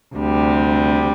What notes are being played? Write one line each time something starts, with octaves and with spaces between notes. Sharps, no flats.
D2 C3 G3